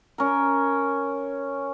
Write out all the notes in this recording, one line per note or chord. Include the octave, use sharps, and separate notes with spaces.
C#4 A#4